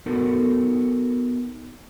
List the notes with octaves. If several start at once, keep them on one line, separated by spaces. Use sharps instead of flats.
B3 D#4 F#4 A4 A#4